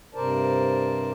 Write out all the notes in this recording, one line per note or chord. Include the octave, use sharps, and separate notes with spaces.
G2 C3 A#4 C5 D5 A5